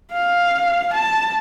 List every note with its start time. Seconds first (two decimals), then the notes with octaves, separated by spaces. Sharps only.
0.13 F5
0.93 A5